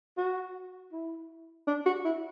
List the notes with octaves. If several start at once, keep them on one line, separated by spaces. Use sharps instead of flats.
F#4
E4
D4
F#4
E4